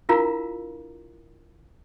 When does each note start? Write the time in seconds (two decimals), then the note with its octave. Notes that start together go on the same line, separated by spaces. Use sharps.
0.09 D4 E4 F4 A#4 F5 A#5